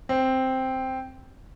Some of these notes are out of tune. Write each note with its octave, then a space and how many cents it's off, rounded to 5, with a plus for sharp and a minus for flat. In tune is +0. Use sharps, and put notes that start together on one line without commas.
C4 +0